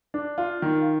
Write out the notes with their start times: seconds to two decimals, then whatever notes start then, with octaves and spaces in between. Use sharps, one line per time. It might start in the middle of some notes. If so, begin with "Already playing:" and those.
0.14 D4
0.38 F4
0.62 D#3